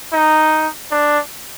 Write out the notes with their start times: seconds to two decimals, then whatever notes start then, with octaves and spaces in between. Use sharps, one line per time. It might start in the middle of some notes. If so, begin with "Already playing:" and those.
0.12 D#4
0.91 D4